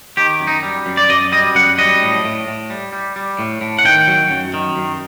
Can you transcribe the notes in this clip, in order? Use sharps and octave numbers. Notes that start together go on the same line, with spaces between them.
D#3 G4
F#2
D#4
G3
F#2
D5
F#2 D#5
G3 D#5
F#2 F#5
G3 D#5
A2
A2
A2
G3
G3
G3
A2
A2
F#5
D#3 G5
F#3
F#2
D#3
F#2